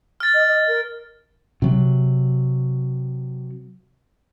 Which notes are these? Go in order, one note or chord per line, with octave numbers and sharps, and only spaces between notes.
F6 A6
D#5
D#5
A#4
C3 F#3